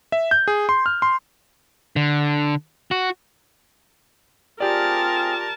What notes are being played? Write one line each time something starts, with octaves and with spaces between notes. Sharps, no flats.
E5
G6
G#4
C6
F6
C6
D3
F#4
C4 F4 G4 G#4 A#4 D5 A5 F6